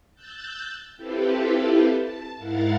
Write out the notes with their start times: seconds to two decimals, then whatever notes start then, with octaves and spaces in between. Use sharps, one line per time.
0.14 E6 F#6 G6 A6
0.96 C4 E4 F4 G4 A4 B4
1.96 A5
2.37 G#2 E4 A#4 F5 F#5 A6